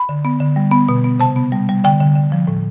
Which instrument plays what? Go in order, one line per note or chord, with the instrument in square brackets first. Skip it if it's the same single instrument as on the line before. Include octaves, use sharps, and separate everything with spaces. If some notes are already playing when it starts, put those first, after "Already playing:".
Already playing: [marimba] B5
D3
B3
D3
G3
B3
B2
B3
C3 A5
B3
G3
G3
D3 G5
D3
D3
F3
A2